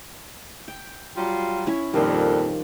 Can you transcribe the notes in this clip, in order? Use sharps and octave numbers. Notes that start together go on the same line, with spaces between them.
G5
F#3 G3 F4
C#4 E4
F2 A#2 D#3 F3 G3